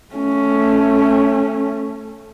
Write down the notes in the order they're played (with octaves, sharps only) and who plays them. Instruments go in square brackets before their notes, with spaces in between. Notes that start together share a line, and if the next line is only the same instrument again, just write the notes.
[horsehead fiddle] A3 C#4